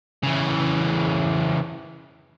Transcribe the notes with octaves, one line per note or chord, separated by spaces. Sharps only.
C#3 E3